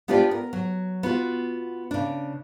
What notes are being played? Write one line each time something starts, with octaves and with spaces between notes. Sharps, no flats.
B3 D4 F4 G4 B4 D5
A#4
F#3
B3 F4 F#4
C#3 D4